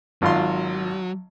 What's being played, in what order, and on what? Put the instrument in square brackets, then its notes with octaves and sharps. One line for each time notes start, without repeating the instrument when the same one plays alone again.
[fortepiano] G#1 F4 C6 [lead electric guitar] F#3